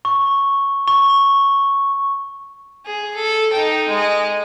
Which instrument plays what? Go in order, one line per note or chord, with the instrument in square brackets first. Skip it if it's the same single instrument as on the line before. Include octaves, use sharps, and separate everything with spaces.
[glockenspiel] C#6
C#6
[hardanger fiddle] G#4
A4
D#4 G5
G#3 D#5